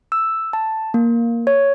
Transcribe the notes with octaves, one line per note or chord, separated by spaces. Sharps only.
E6
A5
A#3
C#5